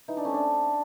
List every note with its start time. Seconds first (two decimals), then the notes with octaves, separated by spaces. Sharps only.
0.08 E3 D#4
0.17 D4
0.25 A3 C4 C#4
0.34 D4